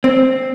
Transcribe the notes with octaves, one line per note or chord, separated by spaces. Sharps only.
C4